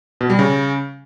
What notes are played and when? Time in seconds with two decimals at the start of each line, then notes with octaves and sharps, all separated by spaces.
0.21 B2
0.30 G3
0.39 C#3